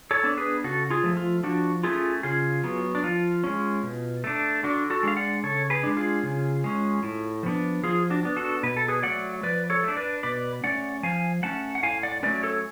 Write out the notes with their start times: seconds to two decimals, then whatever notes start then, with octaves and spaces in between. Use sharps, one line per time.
0.11 A4 C#5
0.23 B3 D4
0.37 G#4 B4
0.64 C#3 F#4 A4
0.90 F4 G#4
1.04 F3 A3
1.17 F4
1.43 F3 D4 F#4
1.83 A3 C#4 F4 G#4
2.23 C#3 F4 G#4
2.63 F#3 B3
2.95 D4
3.04 F3 F4
3.44 G#3 C#4
3.83 B2
4.24 A3 D4
4.63 D3 D4 F#4
4.90 F#4 A4
5.03 G#3 D4 F5
5.17 D5 F#5
5.43 C#3 A4 C#5
5.70 G#4 B4
5.83 G#3 D4
5.97 F4 G#4
6.23 C#3
6.64 G#3 C#4
7.03 A2
7.43 F3 B3 D4
7.83 F3 F4 G#4
8.10 D4 F#4
8.23 B3 D4
8.36 F#4 A4
8.63 B2 B4
8.77 A4
8.88 G#4 B4
9.03 F#3 A3 D5 F#5
9.43 F3 B4 D5
9.70 A4 C#5
9.84 A3 D4
9.96 B4 D5
10.23 B2 B4 D5
10.63 A3 C#4 D5 F#5
11.03 F3 F5 G#5
11.43 A3 C#4 F#5 A5
11.75 F#5
11.83 A2 F5 G#5
12.03 D5 F#5
12.23 F#3 A3 C#4 B4 D5
12.43 A4 C#5